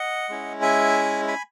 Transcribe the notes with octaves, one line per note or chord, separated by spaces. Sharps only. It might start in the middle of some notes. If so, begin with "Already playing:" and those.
Already playing: D#5 F#5
G#3 C#4 E4
E5 G#5
G#5 B5